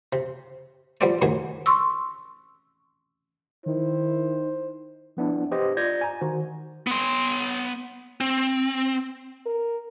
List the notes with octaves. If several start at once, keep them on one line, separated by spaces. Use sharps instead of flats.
C3
F3 G3 B3 C4 D5
A2 C3 D#3 F#3 G#4
C6 C#6 E6
D#3 E4 C5
F3 B3 D4 E4
G4 B4 C5 D#5
F4 D5 G6 G#6 A#6
G#5 A#5
D#3 F#4 C5
B3 C6
C4
A#4